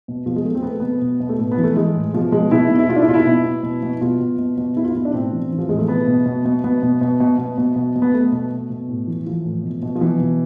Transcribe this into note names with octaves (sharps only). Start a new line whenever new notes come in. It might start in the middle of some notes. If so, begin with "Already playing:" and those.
B2
B2 F3
G#3
B2 A3
C4
B2 B3
A3
B2 B3
B2
B2
A3
A2 B3
B3
E3
A3
E3 G#3
A2
B2 F3
B2 G#3
B2 E4
B2
E4
B2 F4
D4
E4
B2 F4
E4
B2
B2
B2
B2
B2 F4
B2
B2
B2
B2 E4
F4
B2 E4
D4
A2 C4
E3
E3
F3
A2 G#3
A3
B2 B3
B2
B2
B2
B2 B3
B2
B2
B2
B2
B2
B2
B2
B3
B2 A3
B2
B2
B2
A2
E3
E3 F3
A2
B2
B2
F3
B2 E3
B2